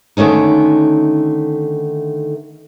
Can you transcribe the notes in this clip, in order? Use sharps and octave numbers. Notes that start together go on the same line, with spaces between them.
D3 D#3 A3 C#4 D#4